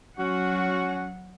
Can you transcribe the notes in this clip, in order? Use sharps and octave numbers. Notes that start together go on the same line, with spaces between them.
F#3 C#4 F#4 F#5